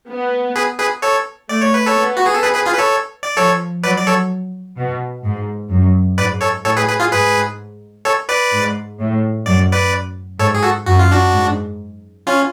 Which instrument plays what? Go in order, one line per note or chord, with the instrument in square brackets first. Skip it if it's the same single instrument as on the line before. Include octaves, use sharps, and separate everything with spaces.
[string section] B3
[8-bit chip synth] G#4 B4
G#4 B4
A4 C#5
[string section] A3 [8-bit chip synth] D5
[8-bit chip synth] C#5
B4
A4 C#5
[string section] B3
[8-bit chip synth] F#4
G#4
A4
G#4 B4
G#4 B4
F4 G#4
B4
A4 C#5
D5
[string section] F3 [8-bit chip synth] A4 C#5
[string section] F#3 [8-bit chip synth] B4 D5
[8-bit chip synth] D5
A4 C#5
[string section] B2
G#2
F#2
[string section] G#2 [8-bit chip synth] B4 D5
[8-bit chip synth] A4 C#5
[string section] A2 [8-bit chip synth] A4 C#5
[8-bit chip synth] G#4 B4
G#4 B4
F4 G#4
[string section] G#2 [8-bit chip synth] G#4 B4
[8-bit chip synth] A4 C#5
B4 D5
[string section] G#2
A2
[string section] F#2 [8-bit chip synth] D5
[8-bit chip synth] B4 D5
[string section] G#2 [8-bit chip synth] A4 C#5
[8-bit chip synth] G#4
F#4 A4
[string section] F#2 [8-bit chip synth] F#4
[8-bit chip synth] F4
D4 F#4
[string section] G#2
[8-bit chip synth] C#4 F4